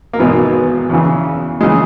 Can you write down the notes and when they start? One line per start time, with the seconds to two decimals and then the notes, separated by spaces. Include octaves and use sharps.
0.13 A#3
0.19 G#1 G#2 B2 E3 B3
0.90 E2 C#3 E3
1.61 C#3 E3 G#3